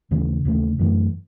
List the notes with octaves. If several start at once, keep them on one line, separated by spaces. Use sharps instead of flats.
D#2 C#3 E3 A3
D#2 C#3 E3 A3
F#2 E3 A3